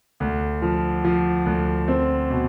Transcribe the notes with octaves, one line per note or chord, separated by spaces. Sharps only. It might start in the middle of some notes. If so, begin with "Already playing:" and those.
D2
F3
F3
D2
C4
B2